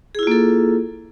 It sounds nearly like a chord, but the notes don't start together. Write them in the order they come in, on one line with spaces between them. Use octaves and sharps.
G#4 E4 F4 A#3 A4